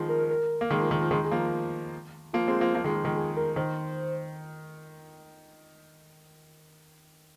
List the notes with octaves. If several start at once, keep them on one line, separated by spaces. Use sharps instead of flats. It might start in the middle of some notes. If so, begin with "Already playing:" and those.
Already playing: D#3 F3 G#3
A#4
A#4
A#3
D#3 G#3
F3
D#3
F3
D#3 G#3 F4
G#4
F3 A#3
A#4
F3 A#3 F4
G#3 C4
F3 A#3
F3 A#3
D#3 G#3
F3
D#3 G#3
G#4
A#4
D#3 C5